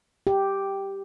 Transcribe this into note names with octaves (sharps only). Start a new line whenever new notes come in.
G4